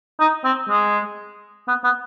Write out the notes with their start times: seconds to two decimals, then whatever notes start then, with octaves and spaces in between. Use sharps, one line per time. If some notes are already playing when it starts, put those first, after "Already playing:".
0.20 D#4
0.44 C4
0.69 G#3
1.68 B3
1.84 B3